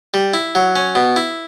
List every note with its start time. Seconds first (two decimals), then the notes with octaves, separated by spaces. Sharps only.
0.14 G3
0.34 E4
0.55 F#3
0.76 C#4
0.95 B2
1.16 E4